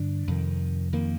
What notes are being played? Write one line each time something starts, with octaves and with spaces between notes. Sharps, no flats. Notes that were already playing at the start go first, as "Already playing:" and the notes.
Already playing: G2 D3 G3 D4
F2 C3 D#3
F2 D#3 A#3